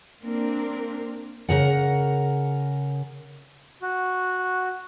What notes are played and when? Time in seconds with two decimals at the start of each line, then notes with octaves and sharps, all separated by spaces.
0.21 A#3 C4 D4 A#4
1.49 C#3 A#4 F#5
3.82 F#4